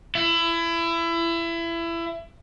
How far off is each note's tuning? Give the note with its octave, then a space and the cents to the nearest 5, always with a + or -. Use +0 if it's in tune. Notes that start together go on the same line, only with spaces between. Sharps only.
E4 +25